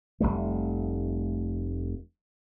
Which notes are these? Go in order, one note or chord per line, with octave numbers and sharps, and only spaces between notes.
F1 C#2 G3 A3